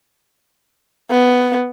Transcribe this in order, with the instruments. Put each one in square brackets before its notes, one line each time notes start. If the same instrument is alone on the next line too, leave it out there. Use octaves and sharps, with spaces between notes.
[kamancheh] B3